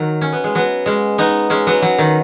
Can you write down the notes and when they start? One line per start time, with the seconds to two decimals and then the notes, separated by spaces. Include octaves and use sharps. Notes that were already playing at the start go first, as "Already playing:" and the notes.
Already playing: D#3 F#3
0.21 C#4
0.32 B3
0.44 G#3
0.55 F#3 B3
0.86 G#3 C#4
1.18 B3 D#4
1.50 G#3 C#4
1.67 F#3 B3
1.82 F#3
1.98 D#3